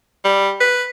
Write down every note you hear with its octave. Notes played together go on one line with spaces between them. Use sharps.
G3
B4